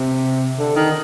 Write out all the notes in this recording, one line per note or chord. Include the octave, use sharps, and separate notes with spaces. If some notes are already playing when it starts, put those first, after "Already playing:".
Already playing: C3
D3
D#3